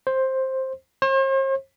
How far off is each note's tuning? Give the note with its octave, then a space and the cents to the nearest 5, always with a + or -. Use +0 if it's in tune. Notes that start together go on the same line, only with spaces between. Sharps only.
C5 +10
C5 +45